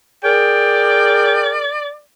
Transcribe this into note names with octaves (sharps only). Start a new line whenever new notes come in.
G#4 A#4 D5 G5